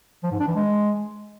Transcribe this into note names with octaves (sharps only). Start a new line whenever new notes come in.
F3
G#2
D4
E3
G#3